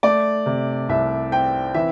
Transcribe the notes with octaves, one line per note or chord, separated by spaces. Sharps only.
A3 D5
C3
C2 E5
C4 G5
E3 E5